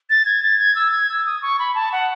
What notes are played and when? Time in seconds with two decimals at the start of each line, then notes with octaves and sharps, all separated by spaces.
0.10 A6
0.26 G#6
0.43 A6
0.59 G#6
0.75 E6
0.92 G#6
1.09 E6
1.26 D#6
1.42 C#6
1.59 B5
1.75 A5
1.92 F#5